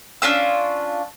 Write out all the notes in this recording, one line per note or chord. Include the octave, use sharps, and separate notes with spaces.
C#4 D4 F4 E6